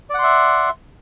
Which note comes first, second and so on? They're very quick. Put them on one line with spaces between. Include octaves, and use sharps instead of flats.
D5 F#5 C6 E5